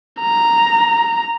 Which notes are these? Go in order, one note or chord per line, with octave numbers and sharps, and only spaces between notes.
A#5